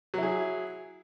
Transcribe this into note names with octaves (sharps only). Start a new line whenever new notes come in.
F#3 E4 G#4